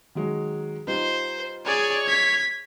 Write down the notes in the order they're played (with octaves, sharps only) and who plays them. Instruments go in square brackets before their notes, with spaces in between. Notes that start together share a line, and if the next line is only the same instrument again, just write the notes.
[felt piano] D#3 F#3 G#3
[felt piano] G3 D#4 F4 [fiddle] C5
[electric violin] G#4 D5 [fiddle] C#5
[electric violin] G#6 B6